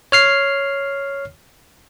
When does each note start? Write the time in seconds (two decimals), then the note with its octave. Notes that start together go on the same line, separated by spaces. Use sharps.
0.12 C#5 F6 C7